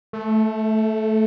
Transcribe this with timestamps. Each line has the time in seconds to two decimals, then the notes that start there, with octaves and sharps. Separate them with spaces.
0.13 A3